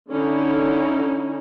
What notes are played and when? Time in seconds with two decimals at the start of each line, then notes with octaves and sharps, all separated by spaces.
0.10 D3 C#4 D#4 E4